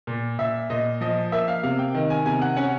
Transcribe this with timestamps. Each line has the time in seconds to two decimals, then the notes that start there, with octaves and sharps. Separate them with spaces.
0.07 A#2
0.39 A#2 E5
0.70 A#2 D#5
1.01 F3 D#5
1.32 A#3 E5
1.48 F5
1.63 C3 F5
1.79 G5
1.94 D#3
2.10 G#5
2.25 C3 G#5
2.42 F#5
2.56 C#4 F#5